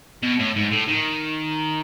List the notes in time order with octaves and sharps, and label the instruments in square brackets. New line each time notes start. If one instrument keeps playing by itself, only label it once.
[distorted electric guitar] B2
A2
G#2
A2
D#3